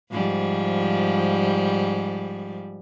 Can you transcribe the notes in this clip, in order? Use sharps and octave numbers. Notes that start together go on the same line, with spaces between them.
G#2 F3 G3